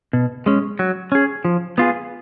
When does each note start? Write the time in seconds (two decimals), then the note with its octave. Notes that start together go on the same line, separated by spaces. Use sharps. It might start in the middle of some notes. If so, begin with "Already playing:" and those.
0.13 B2
0.46 G#3 C#4
0.79 F#3
1.12 C#4 G#4
1.45 F3
1.78 B3 F4 G#4